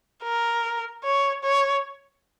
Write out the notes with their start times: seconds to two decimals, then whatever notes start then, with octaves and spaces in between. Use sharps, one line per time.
0.24 A#4
1.04 C#5
1.44 C#5